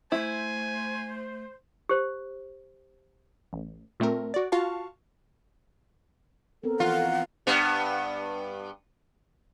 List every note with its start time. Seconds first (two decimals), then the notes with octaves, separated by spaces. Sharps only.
0.12 A3 E4 C5 G#5
1.89 G4 C5
3.53 A1
4.00 A#2 A3 C4 A#4
4.34 F#4 D5
4.52 F4 F#4 F5 A5 C#6
6.63 B3 C4 A4 A#4
6.80 E3 F3 F4 F#5
7.47 G2 B3